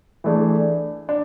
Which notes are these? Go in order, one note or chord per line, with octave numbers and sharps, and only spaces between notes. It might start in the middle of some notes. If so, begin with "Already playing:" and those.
E3 A3 D4 G#4
D4